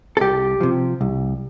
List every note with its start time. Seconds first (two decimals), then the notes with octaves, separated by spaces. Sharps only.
0.17 A4
0.21 C2 G4
0.61 C3 F3
1.01 C2